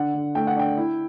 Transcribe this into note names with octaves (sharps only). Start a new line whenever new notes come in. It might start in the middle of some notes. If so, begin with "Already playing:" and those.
Already playing: D3 F#5
D3
A3 G5
F#5
D4 G5
E4